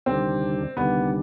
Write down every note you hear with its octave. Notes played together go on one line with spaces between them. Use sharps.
D2 C3 D#3 G3 C4 D4
D2 C3 D#3 G3 B3 D4